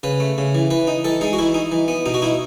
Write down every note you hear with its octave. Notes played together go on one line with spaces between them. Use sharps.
C#3 B4
A3
C#3
E3
E3 B4
D#4
E3 A4
G#3 D#4
F#4
E3 E4
D#4
E3
B3
B2 D#4
F#4
D#4 E4